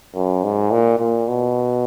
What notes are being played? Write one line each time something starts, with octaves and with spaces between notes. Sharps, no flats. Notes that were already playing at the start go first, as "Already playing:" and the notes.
F#2
G#2
A#2
A#2
B2